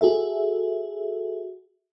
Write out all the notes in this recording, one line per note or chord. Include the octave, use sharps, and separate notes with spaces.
F#4 G#4 A4 E5